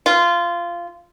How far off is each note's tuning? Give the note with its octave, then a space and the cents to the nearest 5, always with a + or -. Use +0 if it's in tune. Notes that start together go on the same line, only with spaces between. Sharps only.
F4 -15